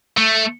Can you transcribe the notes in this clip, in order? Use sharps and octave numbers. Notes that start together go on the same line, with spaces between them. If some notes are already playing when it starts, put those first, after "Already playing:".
A3